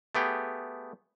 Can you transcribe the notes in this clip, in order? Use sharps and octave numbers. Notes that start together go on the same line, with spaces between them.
A3 B3 G4 G#4